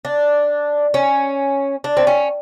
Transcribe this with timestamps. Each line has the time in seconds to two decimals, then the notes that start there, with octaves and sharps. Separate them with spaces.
0.05 D4
0.94 C#4
1.84 D4
1.97 C4
2.07 C#4